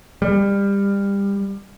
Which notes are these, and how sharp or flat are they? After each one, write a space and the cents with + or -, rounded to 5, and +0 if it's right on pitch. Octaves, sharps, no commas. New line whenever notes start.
G3 +25